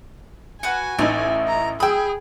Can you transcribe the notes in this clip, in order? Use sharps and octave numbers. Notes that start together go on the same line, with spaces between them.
F#4 B4 F#5 G#5
A1 A3 D#4 A6
A#5
G#4 G5 B5 D#6 E6